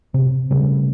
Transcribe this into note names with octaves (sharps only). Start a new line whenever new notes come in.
C3
C#3 G3 A3